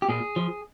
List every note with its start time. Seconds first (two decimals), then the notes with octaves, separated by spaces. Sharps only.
0.02 G4
0.09 A#2 G#4
0.36 F3